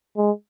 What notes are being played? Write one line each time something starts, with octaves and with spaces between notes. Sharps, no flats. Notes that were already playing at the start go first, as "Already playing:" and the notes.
G#3